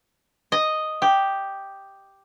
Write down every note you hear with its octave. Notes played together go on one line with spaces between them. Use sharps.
D#5
G4